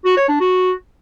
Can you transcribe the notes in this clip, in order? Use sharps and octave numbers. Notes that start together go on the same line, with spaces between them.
F#4
C#5
D4
F#4